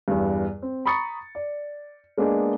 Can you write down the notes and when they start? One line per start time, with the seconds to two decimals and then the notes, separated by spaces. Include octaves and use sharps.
0.08 E2 G2
0.62 C4
0.86 A#5 B5 C#6 D#6 A6 C#7
1.35 D5
2.18 G#3 A#3 B3 D4 G#4 D#5